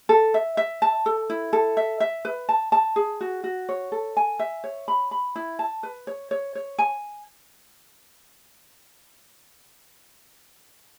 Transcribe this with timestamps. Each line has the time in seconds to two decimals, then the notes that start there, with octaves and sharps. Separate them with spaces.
0.09 A4
0.34 E5
0.57 E5
0.82 A5
1.06 A4
1.30 E4
1.53 A4
1.77 E5
2.00 E5
2.25 B4
2.49 A5
2.72 A5
2.96 G#4
3.21 F#4
3.44 F#4
3.69 C#5
3.92 A4
4.17 G#5
4.39 E5
4.64 C#5
4.88 B5
5.11 B5
5.36 E4
5.59 A5
5.83 B4
6.07 C#5
6.31 C#5
6.55 C#5
6.79 G#5